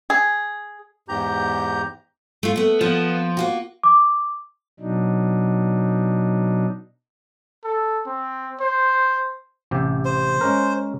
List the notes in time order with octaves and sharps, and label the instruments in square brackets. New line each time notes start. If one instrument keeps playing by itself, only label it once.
[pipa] G#4
[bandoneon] E2 G#2 G4 A#5 G6
[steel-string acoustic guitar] A3 F4
A3 B3
[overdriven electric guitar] F3 [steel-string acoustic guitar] B3
[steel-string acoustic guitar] A#3 F4 F#4
[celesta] D6
[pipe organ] B2 F#3 D4 D#4
[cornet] A4
C4
C5
[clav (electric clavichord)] A1 C3 G4
[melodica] C5
[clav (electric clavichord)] G#3 C#4 A#4